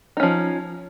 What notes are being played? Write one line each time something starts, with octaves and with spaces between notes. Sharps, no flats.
F3 C#4 D#4